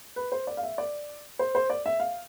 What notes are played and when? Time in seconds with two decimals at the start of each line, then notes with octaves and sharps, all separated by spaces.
0.16 B4
0.32 C5
0.47 D5
0.57 F5
0.63 E5
0.78 D5
1.39 C5
1.55 C5
1.70 D5
1.86 E5
2.00 F5